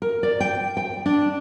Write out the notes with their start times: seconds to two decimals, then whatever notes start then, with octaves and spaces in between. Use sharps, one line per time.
0.02 A#4
0.23 D5
0.40 G5
0.77 G5
1.06 D4